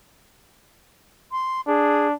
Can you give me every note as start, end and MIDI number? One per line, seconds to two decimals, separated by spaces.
1.31 1.61 84
1.67 2.14 62
1.67 2.07 68